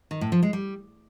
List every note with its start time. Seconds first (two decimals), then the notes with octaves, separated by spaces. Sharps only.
0.11 D#3
0.21 A2
0.32 F3
0.43 G#3
0.53 G3